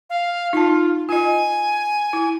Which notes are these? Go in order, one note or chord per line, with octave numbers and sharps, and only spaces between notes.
F5
D#4 F4 A5
F4 D#5 G#5
E4